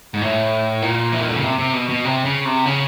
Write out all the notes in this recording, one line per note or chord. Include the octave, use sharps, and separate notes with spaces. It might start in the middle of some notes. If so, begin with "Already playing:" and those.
G#2
A2
A#2
E3
D#3
D3
C#3
C3
C3
B2
B2
C3
C#3
C3
C#3